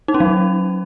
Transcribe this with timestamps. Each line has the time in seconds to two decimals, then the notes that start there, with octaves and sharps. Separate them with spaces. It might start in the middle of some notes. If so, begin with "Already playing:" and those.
0.08 D#4
0.14 C#4
0.20 F#3